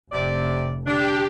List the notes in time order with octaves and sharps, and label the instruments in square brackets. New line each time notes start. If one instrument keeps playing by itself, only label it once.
[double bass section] F1 A2 [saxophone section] C3 D5
[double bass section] D3 [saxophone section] D4 [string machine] G4